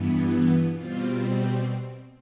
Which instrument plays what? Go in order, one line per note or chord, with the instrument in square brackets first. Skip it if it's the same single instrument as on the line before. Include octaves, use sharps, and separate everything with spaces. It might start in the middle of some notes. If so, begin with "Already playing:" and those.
Already playing: [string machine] G2 E3 B3
E4
B2 G3 C4 F4